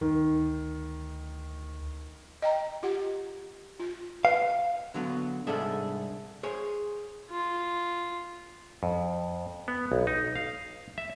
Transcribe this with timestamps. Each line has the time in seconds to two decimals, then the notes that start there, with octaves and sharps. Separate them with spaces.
0.01 D2 D#3
2.42 D#5 G5 A#5
2.83 F4 G4 F#5
3.80 F4
4.25 B4 F5
4.94 D3 F#3 B3
5.47 C2 G#2 D4 G#4 A4 E5
6.43 G#4 C5 C#5
7.30 F4
8.83 F2
9.68 B3
9.92 B1
10.07 D#4
10.36 F5
10.98 E5